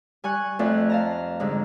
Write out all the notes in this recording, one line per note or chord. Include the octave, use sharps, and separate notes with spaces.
G3 G#5 C#6 F#6
F2 A3 F4 A4 D5 F#6
F5 A5 A#5
G#2 D3 F3 G3 G#3